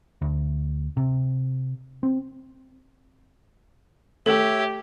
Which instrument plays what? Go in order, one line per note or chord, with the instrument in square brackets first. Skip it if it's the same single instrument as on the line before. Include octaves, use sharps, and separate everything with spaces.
[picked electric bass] D2
C3
C4
[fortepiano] A3 [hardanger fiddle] G4 [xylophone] A4 [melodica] C#5 E5